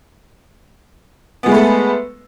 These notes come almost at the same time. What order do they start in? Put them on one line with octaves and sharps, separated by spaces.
B3 G#3 A3 B4 A4